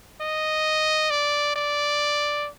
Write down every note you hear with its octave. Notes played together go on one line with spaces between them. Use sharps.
D#5
D5
D5